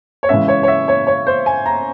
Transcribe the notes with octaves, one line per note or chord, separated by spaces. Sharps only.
C#5
C#3 E3 G#3 C#4 E5
C#5
C#5
E5
C#5
C#5
C5
G#5
A#5